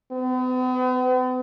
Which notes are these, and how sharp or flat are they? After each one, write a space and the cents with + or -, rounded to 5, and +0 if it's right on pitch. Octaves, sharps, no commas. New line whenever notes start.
B3 +45